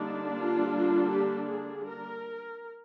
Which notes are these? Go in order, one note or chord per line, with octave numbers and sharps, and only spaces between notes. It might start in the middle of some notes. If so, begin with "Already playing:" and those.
Already playing: D3 G3 A#3 D4 D#4
F4
G4
G#4
A#4